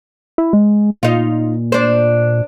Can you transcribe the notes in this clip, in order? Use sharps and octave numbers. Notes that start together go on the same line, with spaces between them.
E4
G#3
A#2 D#4 F4
D4 C5